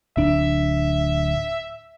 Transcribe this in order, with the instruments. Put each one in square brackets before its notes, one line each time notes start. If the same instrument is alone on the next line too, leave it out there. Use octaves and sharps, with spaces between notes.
[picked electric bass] D1 D4 [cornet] E5